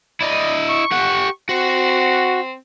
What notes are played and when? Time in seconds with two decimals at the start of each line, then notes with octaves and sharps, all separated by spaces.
0.21 E4 D5 D#5
0.68 C#6
0.92 G4 F#5
1.49 C4 F#4